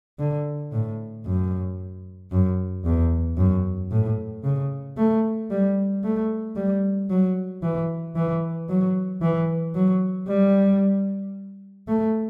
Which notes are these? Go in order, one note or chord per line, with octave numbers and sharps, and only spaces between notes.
D3
A2
F#2
F#2
E2
F#2
A2
C#3
A3
G3
A3
G3
F#3
E3
E3
F#3
E3
F#3
G3
A3